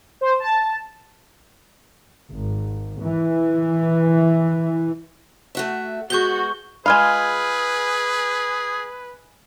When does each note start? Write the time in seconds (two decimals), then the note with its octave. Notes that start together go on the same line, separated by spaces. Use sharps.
0.21 C5
0.40 A5
2.29 G#1
3.01 E3
5.55 A3 F#4 E5
6.10 G#3 B3 F#4 C#6 G6 G7
6.86 G#3 F4 G#4 B4 F5 B5 F6 G#6